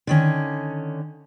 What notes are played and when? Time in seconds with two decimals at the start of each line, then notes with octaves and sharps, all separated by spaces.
0.07 D3 D#3 C#4